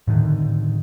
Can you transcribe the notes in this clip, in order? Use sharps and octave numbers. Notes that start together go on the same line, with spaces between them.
A2 D3 D#3